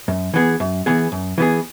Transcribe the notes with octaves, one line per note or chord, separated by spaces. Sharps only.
F#2
E3 B3 G#4
F#2
E3 B3 G#4
F#2
E3 B3 G#4